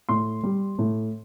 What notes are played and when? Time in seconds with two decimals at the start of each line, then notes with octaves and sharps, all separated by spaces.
0.09 A2 C6
0.43 G3
0.79 A2